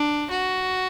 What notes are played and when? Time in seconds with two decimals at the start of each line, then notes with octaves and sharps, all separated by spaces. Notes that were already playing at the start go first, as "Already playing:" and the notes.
Already playing: D4
0.30 F#4